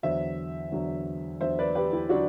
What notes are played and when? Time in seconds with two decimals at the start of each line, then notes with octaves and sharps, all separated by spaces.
0.03 E2 D3 F#3 C5 E5
0.72 E2 D3 F#3
1.41 E2 D3 F#3 C5 E5
1.59 B4 D5
1.75 G4 B4
1.92 E4 G4
2.09 D3 F#3 D4 F#4